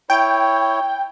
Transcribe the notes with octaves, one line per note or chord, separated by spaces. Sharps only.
E4 C#5 G5